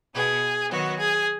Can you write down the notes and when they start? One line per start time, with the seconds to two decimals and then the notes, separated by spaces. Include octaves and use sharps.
0.15 B2 B3 G#4
0.71 D#3 F#3 B3 F#4
0.99 G#4